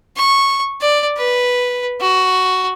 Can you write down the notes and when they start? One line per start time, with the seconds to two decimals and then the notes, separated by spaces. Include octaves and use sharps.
0.17 C#6
0.81 D5
1.17 B4
2.00 F#4